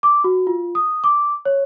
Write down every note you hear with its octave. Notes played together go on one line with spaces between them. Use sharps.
D6
F#4
F4
D#6
D6
C#5